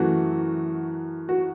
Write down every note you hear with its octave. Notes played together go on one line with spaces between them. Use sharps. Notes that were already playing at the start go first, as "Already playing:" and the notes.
Already playing: F#2 E3 A3 F#4
F#4